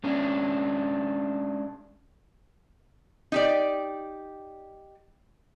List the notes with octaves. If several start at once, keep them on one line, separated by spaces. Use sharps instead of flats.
G#3 C#4 D4
D#4 G4 D5